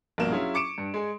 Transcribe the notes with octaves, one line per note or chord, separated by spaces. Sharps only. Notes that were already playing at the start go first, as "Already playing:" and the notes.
A#1 G2 B2 A#3 E7
F#3 C#4 E4 F4 G#4
C#6 D6 C#7 D7 E7
G2
G#3 G#4